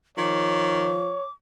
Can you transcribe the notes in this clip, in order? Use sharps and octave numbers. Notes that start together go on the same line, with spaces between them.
D#3 F3 C#5 D6